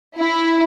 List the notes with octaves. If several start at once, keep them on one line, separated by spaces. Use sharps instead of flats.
E4